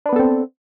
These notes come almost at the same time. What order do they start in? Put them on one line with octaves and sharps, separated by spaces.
D4 B4 B3 A4 C4